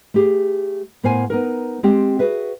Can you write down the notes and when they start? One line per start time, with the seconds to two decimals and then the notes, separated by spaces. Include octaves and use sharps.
0.14 A3 G4 G#4
1.03 A2 B3 A#4 C5 F5 G#5
1.30 B3 D#4 A#4
1.83 G#3 C4 G4 G5
2.19 F#4 G#4 B4 E5